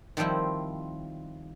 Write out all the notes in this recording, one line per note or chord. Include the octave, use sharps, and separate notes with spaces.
D#3 F3 G3 C4 E4